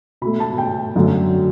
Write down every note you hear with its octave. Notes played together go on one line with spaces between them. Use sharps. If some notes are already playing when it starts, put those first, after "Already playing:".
B2 A3 B5
A5
G5
F#2 D3 F#3 A3